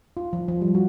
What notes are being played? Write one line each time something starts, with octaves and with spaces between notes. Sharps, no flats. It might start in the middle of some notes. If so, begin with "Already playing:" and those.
F4
F3
F3
G3
F#4